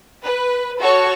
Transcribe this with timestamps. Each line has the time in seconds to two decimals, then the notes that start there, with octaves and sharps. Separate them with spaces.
0.23 B4
0.81 F#4 A4 C#5 C#6